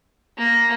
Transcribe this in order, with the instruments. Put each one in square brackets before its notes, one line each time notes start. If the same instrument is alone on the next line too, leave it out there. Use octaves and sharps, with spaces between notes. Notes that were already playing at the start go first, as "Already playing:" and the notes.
[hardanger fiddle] A#3